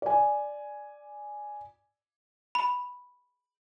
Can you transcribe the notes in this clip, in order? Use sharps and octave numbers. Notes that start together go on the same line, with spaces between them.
D5 G#5
B5